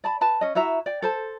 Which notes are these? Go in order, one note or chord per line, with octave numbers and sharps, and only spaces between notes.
D5 A5 B5
B4 A5 B5
C#4 D#5
E4 F#4 E5 A#5
D5 G5
A4 C5 A5